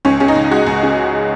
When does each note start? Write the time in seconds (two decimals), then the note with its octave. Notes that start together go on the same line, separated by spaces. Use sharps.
0.05 C#2 C#4
0.20 C#3 C#4
0.28 D#4
0.36 C#2
0.51 G#3 F#4
0.67 C#2
0.83 C#3